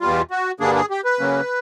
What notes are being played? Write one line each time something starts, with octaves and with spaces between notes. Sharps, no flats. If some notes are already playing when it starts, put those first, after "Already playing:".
E2 B2 G3 F4
F#4
G2 D3 G3 A#3 D4 G#4
G#4
G4
B4
C#3 F#3 A#3 C#4